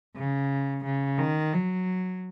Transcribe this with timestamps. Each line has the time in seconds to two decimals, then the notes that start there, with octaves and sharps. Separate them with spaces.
0.16 C#3
0.84 C#3
1.19 D#3
1.53 F#3